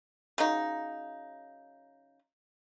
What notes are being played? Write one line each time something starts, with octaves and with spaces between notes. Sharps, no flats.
C#3 F#3 D#4